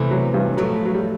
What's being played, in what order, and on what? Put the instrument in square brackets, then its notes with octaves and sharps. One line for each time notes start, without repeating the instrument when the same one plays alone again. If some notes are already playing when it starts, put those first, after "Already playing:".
Already playing: [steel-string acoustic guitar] E2 C3 E3 A3
[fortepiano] F#3
G2 G3
[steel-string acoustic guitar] A2 F3 A3 [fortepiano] F#3
[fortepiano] F#3
G3